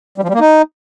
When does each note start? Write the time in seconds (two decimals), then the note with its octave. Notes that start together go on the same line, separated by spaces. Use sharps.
0.18 G3
0.23 F3
0.29 G3
0.34 A#3
0.40 D#4